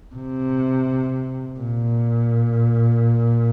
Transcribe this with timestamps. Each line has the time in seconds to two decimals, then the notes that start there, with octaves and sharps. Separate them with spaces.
0.15 C3
1.60 A#2